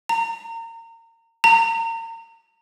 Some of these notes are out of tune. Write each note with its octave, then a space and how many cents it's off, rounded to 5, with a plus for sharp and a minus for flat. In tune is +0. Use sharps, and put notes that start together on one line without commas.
A#5 -30
A#5 -35